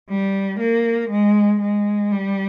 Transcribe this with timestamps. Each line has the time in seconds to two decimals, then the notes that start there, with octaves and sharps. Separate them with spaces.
0.10 G3
0.60 A#3
1.10 G#3
1.61 G#3
2.11 G3